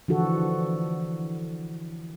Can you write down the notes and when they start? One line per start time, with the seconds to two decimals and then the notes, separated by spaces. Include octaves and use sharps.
0.08 D3 E3 F3 F#4 A4